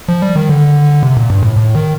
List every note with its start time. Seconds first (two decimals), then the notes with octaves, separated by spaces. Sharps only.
0.08 F3
0.22 G3
0.35 D#3
0.49 D3
1.03 C3
1.17 A#2
1.30 G2
1.43 A2
1.56 A2
1.75 D#3